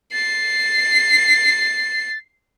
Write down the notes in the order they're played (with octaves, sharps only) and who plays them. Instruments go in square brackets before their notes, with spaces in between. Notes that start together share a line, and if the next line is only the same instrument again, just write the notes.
[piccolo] A6 [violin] C7